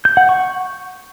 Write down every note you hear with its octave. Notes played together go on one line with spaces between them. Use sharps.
G6
F#5
C#6